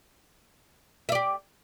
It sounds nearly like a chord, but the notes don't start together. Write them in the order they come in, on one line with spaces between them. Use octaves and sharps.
E5 D5 G4